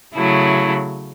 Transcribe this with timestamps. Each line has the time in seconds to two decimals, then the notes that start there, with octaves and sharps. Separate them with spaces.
0.16 C#3 F#3 A3 E4